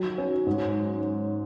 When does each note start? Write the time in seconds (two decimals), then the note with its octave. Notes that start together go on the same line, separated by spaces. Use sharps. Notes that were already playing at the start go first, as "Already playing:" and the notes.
Already playing: D#3 F#3
0.18 C#4
0.46 G#2